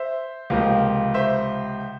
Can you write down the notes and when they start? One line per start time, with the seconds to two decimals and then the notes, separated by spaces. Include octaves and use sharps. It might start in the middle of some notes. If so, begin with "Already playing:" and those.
Already playing: C5 E5
0.50 C#2 C3 F3 A#3
1.14 C5 E5